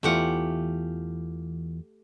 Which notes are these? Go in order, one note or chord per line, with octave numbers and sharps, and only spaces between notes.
E2 E3 A3 F4 G4 F#5